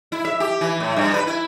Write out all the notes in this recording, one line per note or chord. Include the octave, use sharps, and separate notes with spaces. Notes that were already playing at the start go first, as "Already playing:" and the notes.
E4
E5
G4
E3
A2
G2
B4
E4